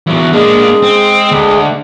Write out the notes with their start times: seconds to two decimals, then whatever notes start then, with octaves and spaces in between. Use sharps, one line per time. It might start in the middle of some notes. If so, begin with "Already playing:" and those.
0.07 E2 F#3
0.33 G#3 A#3 D4 G#4
0.83 C4
1.31 D2